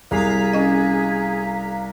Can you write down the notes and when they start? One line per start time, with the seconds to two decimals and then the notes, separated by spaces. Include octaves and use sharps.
0.11 C2 G#4 F5 A#5 B6
0.53 C#4 D#5